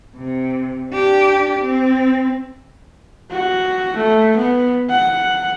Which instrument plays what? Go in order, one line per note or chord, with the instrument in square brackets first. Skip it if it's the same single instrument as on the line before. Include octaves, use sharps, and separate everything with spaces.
[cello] C3
D4 G4
C4
[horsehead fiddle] F#4
A3
B3
F#5